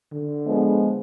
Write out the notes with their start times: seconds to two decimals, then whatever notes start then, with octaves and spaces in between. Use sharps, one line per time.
0.13 D3
0.46 F3 G#3 B3